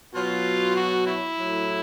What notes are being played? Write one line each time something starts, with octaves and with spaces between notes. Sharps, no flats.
B2 F#3 F4
F#4
E4
A2 F#3